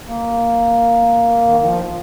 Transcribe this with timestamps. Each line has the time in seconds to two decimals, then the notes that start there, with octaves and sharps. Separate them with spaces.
0.08 A#3
1.49 D#3
1.60 D#3
1.64 F3